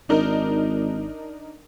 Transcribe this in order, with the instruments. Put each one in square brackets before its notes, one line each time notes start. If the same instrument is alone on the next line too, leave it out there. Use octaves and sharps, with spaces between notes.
[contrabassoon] G#1 [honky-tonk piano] D4 D#4 A#4